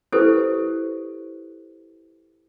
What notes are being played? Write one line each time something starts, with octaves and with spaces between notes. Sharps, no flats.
E4 G4 A4 B4 C5